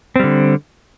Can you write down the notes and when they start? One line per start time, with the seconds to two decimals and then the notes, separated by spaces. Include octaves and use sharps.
0.16 C4
0.20 G3
0.24 D3